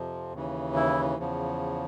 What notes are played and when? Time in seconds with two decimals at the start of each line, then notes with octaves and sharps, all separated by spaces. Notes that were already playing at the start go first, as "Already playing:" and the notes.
Already playing: F2 C3 F3
0.33 D#2 C#3 E3
0.75 E4
1.18 E2 C#3 F3